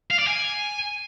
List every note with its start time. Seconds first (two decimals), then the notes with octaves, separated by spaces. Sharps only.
0.11 F5
0.19 D5
0.28 G#5